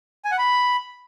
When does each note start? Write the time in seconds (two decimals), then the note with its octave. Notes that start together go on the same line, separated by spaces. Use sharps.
0.25 G#5
0.32 F#5
0.38 B5